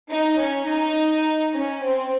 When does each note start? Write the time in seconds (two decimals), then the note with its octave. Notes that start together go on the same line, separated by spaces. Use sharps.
0.09 D#4
0.38 C#4
0.67 D#4
1.53 C#4
1.83 C4